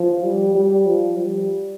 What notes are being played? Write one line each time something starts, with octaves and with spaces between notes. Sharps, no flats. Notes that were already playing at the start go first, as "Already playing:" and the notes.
Already playing: F3
G3
G3
F3
G3